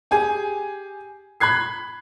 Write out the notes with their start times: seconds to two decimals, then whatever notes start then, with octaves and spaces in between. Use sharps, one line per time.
0.11 G4 G#4 G#5
1.40 B5 F#6 G#6 C7